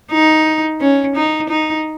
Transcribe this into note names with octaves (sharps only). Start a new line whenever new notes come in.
D#4
C#4
D#4
D#4